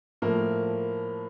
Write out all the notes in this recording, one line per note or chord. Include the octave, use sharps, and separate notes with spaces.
A2 F3 A3 A#3 A#4